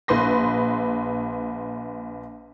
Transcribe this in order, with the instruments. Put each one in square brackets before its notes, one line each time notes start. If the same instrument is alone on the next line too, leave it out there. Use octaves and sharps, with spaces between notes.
[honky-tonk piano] A#1 B4 C6 A#6